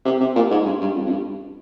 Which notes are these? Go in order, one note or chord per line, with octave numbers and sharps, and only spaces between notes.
C3
C3
A#2
G#2
G2
G2
F2
F2
G2